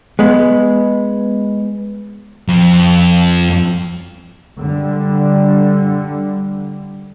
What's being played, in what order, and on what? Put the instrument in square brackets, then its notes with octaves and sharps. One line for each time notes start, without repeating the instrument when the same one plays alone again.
[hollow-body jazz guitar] G#3 B3
[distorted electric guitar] F2 F3
[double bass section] D3 G3